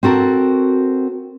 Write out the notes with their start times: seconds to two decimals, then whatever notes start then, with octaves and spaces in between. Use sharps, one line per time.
0.03 C4 F#4 A4 A#4